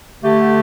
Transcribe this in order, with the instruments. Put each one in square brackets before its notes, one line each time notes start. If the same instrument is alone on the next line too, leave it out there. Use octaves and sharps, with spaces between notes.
[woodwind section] D3 A3 G4